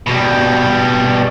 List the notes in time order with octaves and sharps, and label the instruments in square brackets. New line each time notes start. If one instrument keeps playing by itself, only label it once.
[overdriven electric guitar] B2 G3